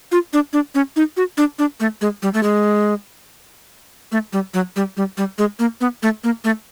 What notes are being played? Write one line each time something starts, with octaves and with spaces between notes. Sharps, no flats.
F4
D4
D4
C#4
D#4
F#4
D4
D4
A3
G#3
G3
A3
G#3
A3
G3
F#3
G3
G3
G3
G#3
A#3
B3
A3
A#3
A3